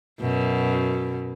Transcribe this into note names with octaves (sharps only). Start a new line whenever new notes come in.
F#2 B2